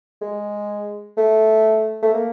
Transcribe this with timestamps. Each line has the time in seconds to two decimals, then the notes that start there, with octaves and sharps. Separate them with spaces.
0.21 G#3
1.17 A3
2.03 A3
2.14 A#3